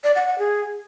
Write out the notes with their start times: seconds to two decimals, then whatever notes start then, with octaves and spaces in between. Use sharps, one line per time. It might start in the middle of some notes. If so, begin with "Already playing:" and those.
0.04 D5
0.16 F#5
0.27 F#5
0.39 G#4